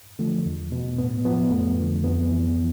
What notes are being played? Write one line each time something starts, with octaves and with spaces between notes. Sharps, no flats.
D3 F3 A3
E2
B2
A2 B3
F3 B3
F2 A3
D3 F3
F2 B3
E3